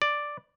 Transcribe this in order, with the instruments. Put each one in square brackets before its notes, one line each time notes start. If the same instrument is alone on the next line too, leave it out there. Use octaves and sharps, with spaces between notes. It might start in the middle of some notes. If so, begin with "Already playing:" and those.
[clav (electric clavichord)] D5